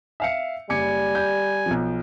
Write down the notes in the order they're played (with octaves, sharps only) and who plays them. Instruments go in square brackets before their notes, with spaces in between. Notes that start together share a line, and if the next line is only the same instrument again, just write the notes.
[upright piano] E5 F5 C#7
[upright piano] F#1 D6 C#7 [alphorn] G3 [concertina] G#5
[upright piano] G6
B1 F3